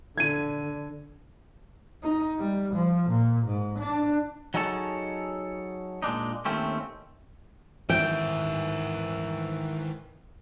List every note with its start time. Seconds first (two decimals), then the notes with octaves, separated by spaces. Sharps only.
0.18 D3 G#6 D#7
2.03 D#4
2.39 G3
2.74 F3
3.09 A#2
3.45 G#2
3.78 D4
4.54 F#3 D#4 G#4 A4 C#5 A5
6.02 A#2 G#3 D4 D#4
6.45 D#2 A3 C4 C#4
7.90 G#2 D#3 E3 A#4 E5 G5